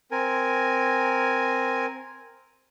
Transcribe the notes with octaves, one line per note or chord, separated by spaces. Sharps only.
C4 A#4 G#5